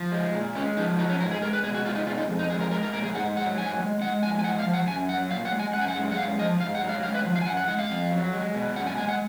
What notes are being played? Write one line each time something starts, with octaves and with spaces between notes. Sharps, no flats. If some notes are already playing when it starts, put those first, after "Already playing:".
Already playing: F3
G#3
A#2
G#3 C#4
F3 D#4
F#3 D#4
C#4
G#2 A#4
G#4
G#3 A#4
B4
B2 G#4
F#4
G#3 F4
D#4
B2 F4
D#4
F2
D#4
G#3 G#4
A#4
G#3 A#4
A#4
A#2 A#4
G#4
G#2 F#5
F#3 F#5
G#2 G#5
G#3
G#3 F#5
F3 G#5
G#5
G#3 F#5
F5
F3
F#5
F#2 G#5
F#3 F#5
A#2 F5
F#5
G#3
G#5
F#2 F#5
G#5
F#5
G#3
F#5
F#2 F5
F3 D#5
G#2 F5
F#5
F#3
F5
G#3 F5
B4
F3
F5
G#5
F#2 F#5
F#5
G#3 F#5
F5
F2
F#3
G#3
B2
F#2 F#5
G#5
G#3 G#5
F#5